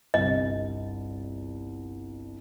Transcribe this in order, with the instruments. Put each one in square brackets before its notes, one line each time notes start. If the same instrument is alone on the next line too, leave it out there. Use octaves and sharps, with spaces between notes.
[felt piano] G1 C2 [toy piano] D#5